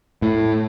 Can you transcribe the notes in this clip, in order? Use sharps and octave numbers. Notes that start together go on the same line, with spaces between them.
A2